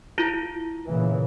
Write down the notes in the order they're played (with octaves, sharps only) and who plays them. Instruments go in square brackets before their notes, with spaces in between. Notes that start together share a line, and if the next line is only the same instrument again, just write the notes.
[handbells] E4 F4
[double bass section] A#2 C#3 E3